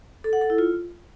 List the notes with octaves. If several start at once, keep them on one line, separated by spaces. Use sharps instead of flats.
A4
F#5
A4
E4
F4